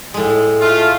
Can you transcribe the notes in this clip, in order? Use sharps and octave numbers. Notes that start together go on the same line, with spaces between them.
A2 G#3
A3 F4